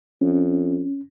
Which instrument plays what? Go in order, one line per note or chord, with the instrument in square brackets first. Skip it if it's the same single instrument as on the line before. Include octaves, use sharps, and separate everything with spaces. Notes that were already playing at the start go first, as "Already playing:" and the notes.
[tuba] F2 [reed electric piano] C#4